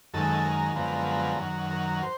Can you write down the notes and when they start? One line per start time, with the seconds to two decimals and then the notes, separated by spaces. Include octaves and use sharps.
0.14 F#2 D#3 G#3 A4
0.45 A#4
0.76 F#2 D3 F3 G#3 B3
1.07 A#4
1.39 F#2 D#3 F#3
1.71 A#4
2.02 C5